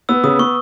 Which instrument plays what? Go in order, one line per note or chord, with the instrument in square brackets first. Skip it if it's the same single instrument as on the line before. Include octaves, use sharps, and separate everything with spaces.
[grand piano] B3 [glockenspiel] E6
[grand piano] C#3 [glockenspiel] D#6
[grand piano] B3 [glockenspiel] C#6